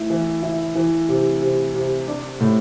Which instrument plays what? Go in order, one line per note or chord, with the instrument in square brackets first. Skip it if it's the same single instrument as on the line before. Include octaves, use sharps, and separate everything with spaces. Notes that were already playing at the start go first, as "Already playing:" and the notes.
Already playing: [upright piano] A3 E4
E3
E4
E3
C3
C3
C3
D4
A2